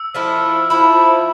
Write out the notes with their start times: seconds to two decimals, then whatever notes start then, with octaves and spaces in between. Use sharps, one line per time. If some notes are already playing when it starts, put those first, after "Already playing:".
Already playing: E6
0.14 F3 A3 E4
0.70 F3 A3 E4